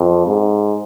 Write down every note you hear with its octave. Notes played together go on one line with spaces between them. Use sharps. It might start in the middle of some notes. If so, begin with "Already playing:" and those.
Already playing: F2
G#2